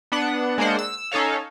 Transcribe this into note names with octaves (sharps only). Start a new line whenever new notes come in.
B3 D4 F#5
G#3 A#3 D4 C5 F#5
E6
C#4 D#4 A4 C#5 F5